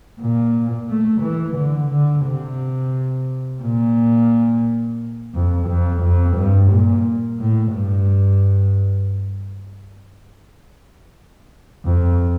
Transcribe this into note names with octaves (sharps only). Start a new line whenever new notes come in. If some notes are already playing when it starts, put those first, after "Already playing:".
A#2
A3
E3
D3
D3
C3
A#2
F2
F2
F2
G2
A#2
A2
G2
F2